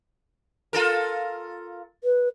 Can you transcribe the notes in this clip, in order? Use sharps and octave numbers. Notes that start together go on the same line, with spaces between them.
F4 A4 A#4
B4